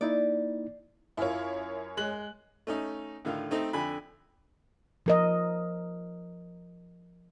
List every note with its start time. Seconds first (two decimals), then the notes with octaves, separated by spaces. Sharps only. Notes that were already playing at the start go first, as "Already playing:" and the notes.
0.01 A#3 D#4 E4 D5
1.17 F#2 E4 F4 A#4 C#5
1.97 G#3 F#6 F#7
2.67 A3 C#4 D#4
3.25 A2 D3 D#3 F4
3.51 A3 C4 D#4
3.73 F2 D3 G#5 B5
5.06 F3 A#4 D#5